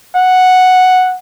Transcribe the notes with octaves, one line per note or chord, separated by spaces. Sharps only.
F#5